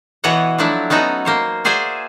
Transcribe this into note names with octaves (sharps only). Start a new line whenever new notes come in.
B2 E3 B3 F#4 C#5 F#5
F3 F#3 A3 D4 E4
B3 C#4 D#4 F#4 A4
A#3 C5 C#5
F#4 G#4 C5 D5 E5 G#5